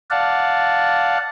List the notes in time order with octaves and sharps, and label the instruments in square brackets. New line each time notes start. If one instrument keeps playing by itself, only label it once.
[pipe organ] D5 F5 F#5 A5